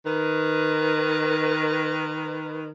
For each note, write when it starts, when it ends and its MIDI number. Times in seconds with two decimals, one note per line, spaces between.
0.06 2.71 51
0.06 2.71 71